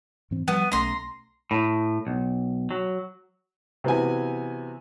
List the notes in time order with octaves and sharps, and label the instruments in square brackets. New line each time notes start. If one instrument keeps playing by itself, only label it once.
[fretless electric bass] G#2 E3 C4
[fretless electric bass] F3 G3 [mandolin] B3
[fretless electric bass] B1 A3 C#4 [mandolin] A#5 C6
[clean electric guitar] A2
B1
F#3
[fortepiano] C3 E3 B3 F#4 G#5